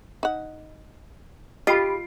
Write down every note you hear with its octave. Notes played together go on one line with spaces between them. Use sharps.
D#4 F#5
F4 G4 D#5 B5 C7 D7